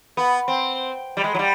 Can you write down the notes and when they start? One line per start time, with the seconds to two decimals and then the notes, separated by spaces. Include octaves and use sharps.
0.17 B3
0.48 C4
1.17 G3
1.24 G#3
1.34 F#3
1.39 G3